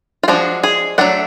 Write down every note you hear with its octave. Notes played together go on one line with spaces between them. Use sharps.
F4
F3 G#3 D4 F#4
G#4
F#3 A3 D4 F#5